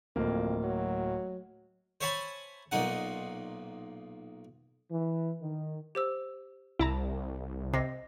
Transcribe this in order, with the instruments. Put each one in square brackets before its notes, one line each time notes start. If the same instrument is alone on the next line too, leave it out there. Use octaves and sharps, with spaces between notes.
[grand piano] D1 A#3 [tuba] F2
[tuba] F#3
[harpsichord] C5 C#5 E5 G#5 A5 B5
B1 A#2 D#4 F#5
[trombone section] E3
D#3
[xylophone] G4 C5 E6
[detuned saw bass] C2 [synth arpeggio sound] E4 A5 A#5
[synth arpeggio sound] C3 [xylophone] D#5 A#6 C7